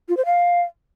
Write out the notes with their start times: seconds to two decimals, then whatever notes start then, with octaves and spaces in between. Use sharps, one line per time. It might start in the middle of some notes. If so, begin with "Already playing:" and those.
0.09 F4
0.17 C5
0.25 F5